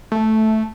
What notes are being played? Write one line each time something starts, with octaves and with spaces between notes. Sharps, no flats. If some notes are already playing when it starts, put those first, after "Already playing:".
A3